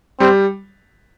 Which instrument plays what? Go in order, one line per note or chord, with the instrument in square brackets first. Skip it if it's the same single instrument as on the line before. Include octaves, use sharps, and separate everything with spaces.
[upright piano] G3 [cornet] C4